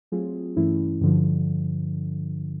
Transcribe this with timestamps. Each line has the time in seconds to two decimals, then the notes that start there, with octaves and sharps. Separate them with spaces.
0.12 F#3 A3 C4 F4 G#4
0.56 G2 E3 A3 C#4 E4
1.01 G2 D3 F3